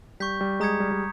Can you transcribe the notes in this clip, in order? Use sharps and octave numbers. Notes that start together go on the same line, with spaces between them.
G3 C#6 G6 B6
G3
G#3 A#5 D#6 G#6 C#7
G3
G3